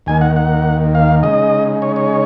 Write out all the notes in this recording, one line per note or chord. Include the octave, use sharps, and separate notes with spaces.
D#2 D#3 A#3 G#5
F#5
F#5
F5
C#3 G#3 D#4 D#5
C#5
C#5